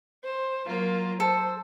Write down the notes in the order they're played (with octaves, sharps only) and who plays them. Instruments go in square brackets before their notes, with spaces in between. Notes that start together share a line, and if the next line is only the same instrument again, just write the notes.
[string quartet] C5
F#3 A#3 F4
[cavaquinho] A4 [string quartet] C5